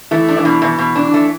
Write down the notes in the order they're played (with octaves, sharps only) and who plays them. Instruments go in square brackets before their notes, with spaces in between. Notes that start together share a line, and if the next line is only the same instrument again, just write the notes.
[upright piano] E3 E4 [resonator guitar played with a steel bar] A3
[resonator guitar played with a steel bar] D4
[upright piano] E3 E4
[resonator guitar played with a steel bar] B2
[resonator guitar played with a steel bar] B2 [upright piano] E3 E4
[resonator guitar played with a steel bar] B2
D4
A3